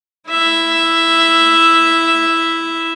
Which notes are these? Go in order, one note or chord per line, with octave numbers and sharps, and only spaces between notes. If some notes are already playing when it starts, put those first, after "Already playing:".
E4 E5